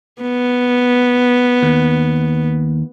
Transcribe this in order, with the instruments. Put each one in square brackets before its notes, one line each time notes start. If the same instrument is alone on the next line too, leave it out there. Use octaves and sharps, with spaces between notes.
[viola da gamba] B3
[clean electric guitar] D#2